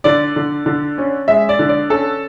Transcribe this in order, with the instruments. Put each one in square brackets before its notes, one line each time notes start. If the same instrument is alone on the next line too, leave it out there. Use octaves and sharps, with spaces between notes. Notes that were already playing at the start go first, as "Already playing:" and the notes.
[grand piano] D3 D5
D3
D3
C#4
G#3 E5
D5
D3
D5
C#4 A4